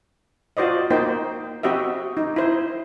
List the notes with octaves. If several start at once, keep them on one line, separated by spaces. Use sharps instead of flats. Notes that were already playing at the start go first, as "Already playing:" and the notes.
F4 F#4 C5 D5 D#5
A#3 D#4 C5 G5
C4 F#4 G4 D#5 E5
D#4
E4 C5